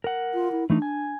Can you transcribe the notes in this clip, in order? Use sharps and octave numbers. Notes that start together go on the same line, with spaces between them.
A#4 F#5
F4
E4
E3 A3 D4 D#4
G#5